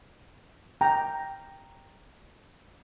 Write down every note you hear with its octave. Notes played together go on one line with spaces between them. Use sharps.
G5 A#5